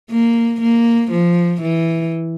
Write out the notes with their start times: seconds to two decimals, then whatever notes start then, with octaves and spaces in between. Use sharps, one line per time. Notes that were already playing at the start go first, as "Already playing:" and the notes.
0.10 A#3
0.61 A#3
1.11 F3
1.62 E3